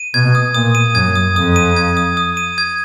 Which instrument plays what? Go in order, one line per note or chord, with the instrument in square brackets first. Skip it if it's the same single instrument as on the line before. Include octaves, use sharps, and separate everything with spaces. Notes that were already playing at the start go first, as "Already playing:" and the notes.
Already playing: [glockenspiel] D#7
[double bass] B2 [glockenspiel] G#6
[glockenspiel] D#6
[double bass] A#2 [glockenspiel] D#6
[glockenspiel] D#7
[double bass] F#2 [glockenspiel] G#6
[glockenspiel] D#6
[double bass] F2 [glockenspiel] D#6
[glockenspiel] D#7
G#6
D#6
D#6
D#7
G#6